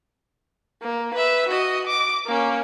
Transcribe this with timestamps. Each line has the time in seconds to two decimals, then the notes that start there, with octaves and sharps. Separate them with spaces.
0.82 A#3
1.14 B4 E5
1.48 F#4 D#5
1.87 D6
2.27 A#3 C#4